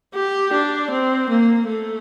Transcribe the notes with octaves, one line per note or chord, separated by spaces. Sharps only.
G4
D4
C4
A#3
A3